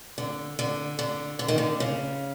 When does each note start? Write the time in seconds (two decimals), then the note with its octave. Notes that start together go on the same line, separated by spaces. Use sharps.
0.18 D3
0.59 D3
0.99 D3
1.39 D3
1.48 D#3
1.58 D3
1.80 C#3